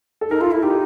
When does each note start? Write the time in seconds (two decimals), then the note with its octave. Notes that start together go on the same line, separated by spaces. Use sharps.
0.21 A4
0.30 D#4 A#4
0.41 F4 A4
0.51 E4
0.63 D#4 G4